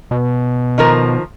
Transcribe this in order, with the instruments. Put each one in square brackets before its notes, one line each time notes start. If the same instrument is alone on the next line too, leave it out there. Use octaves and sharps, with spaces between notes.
[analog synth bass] B2
[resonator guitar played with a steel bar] D#3 F3 A#4